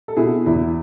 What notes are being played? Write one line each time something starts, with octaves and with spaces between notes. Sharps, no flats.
A4
B2 E4 G#4
E2 E4